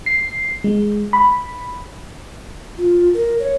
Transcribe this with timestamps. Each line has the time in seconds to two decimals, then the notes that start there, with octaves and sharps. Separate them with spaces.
0.06 C7
0.64 G#3
1.13 B5
2.78 F4
3.14 A#4
3.39 C#5